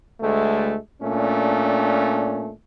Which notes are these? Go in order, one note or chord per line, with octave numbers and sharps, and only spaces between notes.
D2 G#3 A3
A#2 A3 C#4 D4